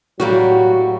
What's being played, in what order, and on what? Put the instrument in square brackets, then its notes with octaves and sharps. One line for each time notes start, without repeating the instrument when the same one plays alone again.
[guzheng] A2 G3 A#3 [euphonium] F#3 [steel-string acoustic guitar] F#4